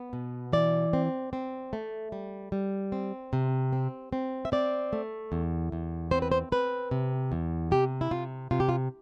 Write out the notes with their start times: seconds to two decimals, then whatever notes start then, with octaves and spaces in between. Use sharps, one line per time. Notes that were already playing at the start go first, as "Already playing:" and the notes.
Already playing: B3
0.13 B2
0.53 E3 D5
0.93 C4
1.33 C4
1.73 A3
2.12 G3
2.52 G3
2.92 C4
3.33 C3
3.73 C4
4.13 C4
4.45 E5
4.52 C4 D5
4.93 A3
5.32 E2
5.72 E2
6.11 C4 C5
6.22 B4
6.32 C5
6.52 C4 B4
6.91 C3
7.32 E2
7.71 C3 G4
8.01 E4
8.11 C3 F4
8.51 C3 F4
8.60 G4
8.69 F4